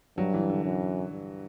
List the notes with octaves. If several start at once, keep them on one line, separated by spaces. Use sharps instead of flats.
G2 F#3
E3
D3
F#2
G2